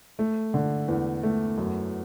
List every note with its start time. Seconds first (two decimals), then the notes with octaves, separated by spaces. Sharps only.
0.19 A3
0.54 D3
0.88 E2
1.23 A3
1.58 F#2